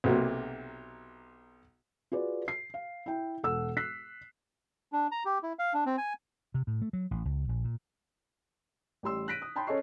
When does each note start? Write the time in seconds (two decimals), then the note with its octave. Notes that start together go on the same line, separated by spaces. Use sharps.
0.04 B1 C3 F#3 A#3
2.12 F4 F#4 G#4 B4 D5
2.48 C7
2.74 F5
3.06 E4 G5
3.43 E1 A4 F#5 E6
3.77 E6 F#6 B6 C7
4.92 D4
5.12 A#5
5.25 G4
5.43 E4
5.59 F5
5.74 D4
5.86 C4
5.98 G#5
6.54 C3
6.67 A2
6.82 A3
6.93 F#3
7.11 A1
7.25 C#2
7.49 A#1
7.64 A#2
9.03 A1 G3 C6 E6
9.28 F#6 A#6 B6 D7 D#7
9.42 D#6
9.56 G5 A5 B5 C6 G6
9.67 C#4 A4 C#5 D#5 C#6 C7